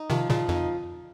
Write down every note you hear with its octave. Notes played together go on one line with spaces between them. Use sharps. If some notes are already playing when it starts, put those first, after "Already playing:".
Already playing: D#4
C3 D#3 F3
A#2 C#3 F3
F2 D#4